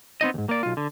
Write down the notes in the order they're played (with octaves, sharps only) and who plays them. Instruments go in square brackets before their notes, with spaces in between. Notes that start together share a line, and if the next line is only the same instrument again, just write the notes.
[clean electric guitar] B3 C4 D#4 D#5
D#2 G#2
A#3 D5
B1 F4
D3